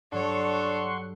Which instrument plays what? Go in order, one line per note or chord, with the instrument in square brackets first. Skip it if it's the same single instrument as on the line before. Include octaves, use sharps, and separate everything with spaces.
[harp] G2 F#3 [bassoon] D4 [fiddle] A4 C#5 [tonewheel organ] F#5 C6 C#6